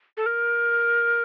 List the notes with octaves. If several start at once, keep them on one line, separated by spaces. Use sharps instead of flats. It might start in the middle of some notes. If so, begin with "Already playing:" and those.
A4
A#4